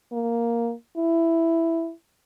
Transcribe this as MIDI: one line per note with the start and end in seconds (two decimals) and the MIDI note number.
0.13 0.73 58
0.97 1.91 64